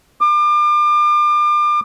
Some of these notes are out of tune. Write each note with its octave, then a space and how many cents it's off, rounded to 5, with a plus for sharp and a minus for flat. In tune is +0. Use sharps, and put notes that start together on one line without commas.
D6 +35